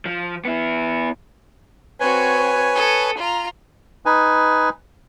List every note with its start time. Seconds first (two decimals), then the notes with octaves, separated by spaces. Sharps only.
0.06 F3
0.45 B3 E4
2.00 C4 F#4 B4 C#5 G#5
2.75 A4 D#6
3.19 F4 A#5
4.06 D#4 B4 G#5